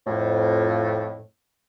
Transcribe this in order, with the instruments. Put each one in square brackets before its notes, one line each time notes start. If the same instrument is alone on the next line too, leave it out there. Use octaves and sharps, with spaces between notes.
[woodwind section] F2 A2